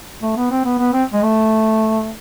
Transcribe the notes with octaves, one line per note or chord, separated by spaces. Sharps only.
A3
B3
C4
B3
B3
C4
G#3
A3